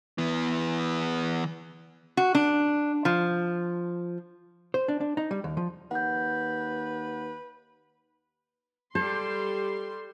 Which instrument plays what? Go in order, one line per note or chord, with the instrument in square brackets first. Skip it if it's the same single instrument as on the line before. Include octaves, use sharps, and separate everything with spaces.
[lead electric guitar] E3 B3
[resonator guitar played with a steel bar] F#4
D4
F3
[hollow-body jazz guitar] C5
D4
D4
D#4
G3
D#2
F3
[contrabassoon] D#2 [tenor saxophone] B4 [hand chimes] F#5 G6
[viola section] G3 C6 [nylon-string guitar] A4 [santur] C5